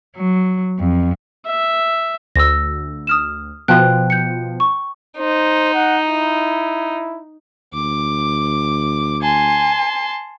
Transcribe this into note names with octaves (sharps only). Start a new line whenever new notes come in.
F#3
F2
E5
D2 E6 A#6
D#6 F6 E7
B2 F3 G5 F#6
G6 C#7
C#6
D#4 C5
F#5
E4
D2 D6
G#5 A5 C6